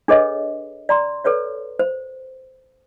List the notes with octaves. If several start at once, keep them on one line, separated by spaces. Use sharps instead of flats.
D4 G#4 A4 B4 C#5 D#5
D5 A#5 C6
A4 B4 C#5 D5
C5